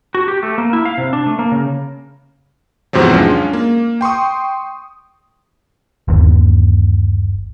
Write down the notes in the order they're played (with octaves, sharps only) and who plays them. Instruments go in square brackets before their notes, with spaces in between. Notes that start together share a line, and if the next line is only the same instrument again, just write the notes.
[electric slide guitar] F#4
G4
A3
A#3
E4
F5
C3
D4
A3
A#3
C#3
[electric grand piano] E2 G#2 C3 F3 F#3
G#3 C#4 D4 F4
A#3
G5 C6 C#6 D#6
[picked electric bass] G1 D#2